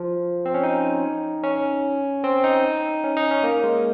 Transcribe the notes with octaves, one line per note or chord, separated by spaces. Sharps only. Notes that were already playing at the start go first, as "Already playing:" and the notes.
Already playing: F3
C4
C#4
D#4
C#4
C4
D#4
C#4
D#4
C#4
A#3
G#3